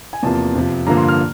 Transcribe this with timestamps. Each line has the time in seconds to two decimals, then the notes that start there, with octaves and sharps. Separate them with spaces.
0.13 G#5
0.23 E2 C3 F3 A#3 A5
0.55 F2 C3 F3
0.86 G2 D3 F3 A#3 A#5
0.97 C6
1.08 F6